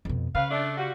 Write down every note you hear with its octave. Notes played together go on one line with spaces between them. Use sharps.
F2 B2
C#3 B4 C#5 F5
A3 D4
G3 F4 F#4